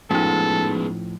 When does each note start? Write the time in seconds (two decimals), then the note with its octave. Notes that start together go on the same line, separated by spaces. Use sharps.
0.11 A2 F3 G#3 B3 C#4 D#4 A4